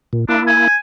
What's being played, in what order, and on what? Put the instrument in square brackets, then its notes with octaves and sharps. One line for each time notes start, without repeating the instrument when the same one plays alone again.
[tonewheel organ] A#2
[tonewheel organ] A#3 E4 [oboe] D4
[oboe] G#5